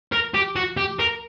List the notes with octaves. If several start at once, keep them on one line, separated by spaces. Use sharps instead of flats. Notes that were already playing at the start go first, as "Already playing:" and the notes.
A#4
G4
F#4
G4
A#4